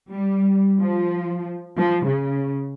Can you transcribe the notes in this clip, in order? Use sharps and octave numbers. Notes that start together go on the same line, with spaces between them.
G3
F3
F3
C#3